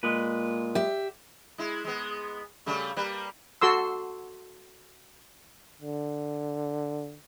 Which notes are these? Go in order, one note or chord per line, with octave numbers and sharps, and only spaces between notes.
A#2 G#3 B4
G4 E5
G#3 E4
G#3 B3
C#3 G3 A3
G3 A#3 B4
F#4 A4 C6 E6
D3